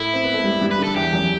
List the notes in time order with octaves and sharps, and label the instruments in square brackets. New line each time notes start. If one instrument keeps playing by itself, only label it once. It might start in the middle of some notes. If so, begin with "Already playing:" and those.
Already playing: [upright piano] A2 A3 [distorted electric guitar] E4
[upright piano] C4
B3
A3
G2 G3
G2 G3
[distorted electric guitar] B4
[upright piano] D3 [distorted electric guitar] A4
[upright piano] E2 E3 [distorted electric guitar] G4
[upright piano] F#2 F#3